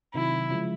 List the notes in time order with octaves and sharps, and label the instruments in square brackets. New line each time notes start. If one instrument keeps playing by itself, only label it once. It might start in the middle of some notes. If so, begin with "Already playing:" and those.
[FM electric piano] C3 D#3 F#3 [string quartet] E4
[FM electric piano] C#3 F3 G#3